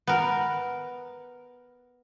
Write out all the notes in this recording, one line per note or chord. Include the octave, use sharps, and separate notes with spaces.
B3 A#4